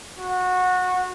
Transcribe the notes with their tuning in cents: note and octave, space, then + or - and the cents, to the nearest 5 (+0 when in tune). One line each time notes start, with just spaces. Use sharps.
F#4 -20